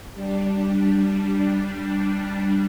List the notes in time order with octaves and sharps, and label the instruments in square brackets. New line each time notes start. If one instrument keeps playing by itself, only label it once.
[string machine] G3 D4